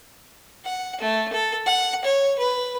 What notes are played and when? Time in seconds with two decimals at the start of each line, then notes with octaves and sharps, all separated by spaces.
0.65 F#5
1.01 A3
1.33 A4
1.66 F#5
2.05 C#5
2.39 B4